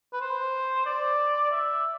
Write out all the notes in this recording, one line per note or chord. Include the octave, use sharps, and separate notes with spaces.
B4
C5
D5
E5